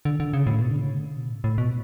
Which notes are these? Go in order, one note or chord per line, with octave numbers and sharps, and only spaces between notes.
D3
D3
C#3
A2
B2
D3
C#3
D3
B2
A2
A2
B2